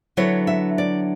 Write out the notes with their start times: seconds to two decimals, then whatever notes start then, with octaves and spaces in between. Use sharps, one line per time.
0.17 D3 F#3 B3 E4 C#5
0.47 E5
0.78 D5